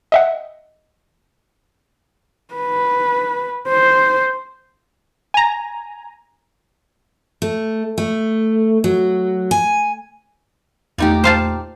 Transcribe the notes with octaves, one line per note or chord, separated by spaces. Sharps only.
D#5 E5 F#5
B4
C5
G#5 A#5
A3
A3
F#3
G#5
E2 A#2 A3 D#4 G4
C5 F5 A5